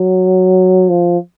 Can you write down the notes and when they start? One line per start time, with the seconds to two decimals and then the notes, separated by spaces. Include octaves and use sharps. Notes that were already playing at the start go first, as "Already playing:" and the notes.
Already playing: F#3
0.89 F3